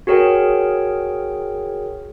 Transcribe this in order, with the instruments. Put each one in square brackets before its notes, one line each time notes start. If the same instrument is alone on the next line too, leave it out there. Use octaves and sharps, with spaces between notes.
[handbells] F#4 G#4 A#4 C#5 G5